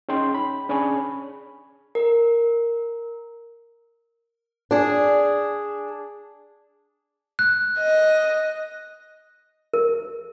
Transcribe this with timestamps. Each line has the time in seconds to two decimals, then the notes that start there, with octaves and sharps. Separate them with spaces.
0.09 C#4 D#4 G#4 G5 C6
0.35 B5
0.69 C#4 D4 G#4 C#5 G#5 B5
1.95 A#4
4.71 D4 G#4
7.39 F#6
7.78 D#5
9.74 A#4